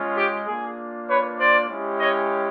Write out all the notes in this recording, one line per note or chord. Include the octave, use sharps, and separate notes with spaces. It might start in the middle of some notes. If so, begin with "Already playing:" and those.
Already playing: G#3 C#4 F4
G4
A#3 D4 F4 G#4
B4 C#5
C5 D5
G#3 C#4 E4 G4
C#5 D#5